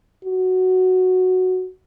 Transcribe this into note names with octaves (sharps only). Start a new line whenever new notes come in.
F#4